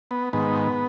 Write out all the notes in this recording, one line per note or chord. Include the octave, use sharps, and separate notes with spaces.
B3
G#2 D#3 B3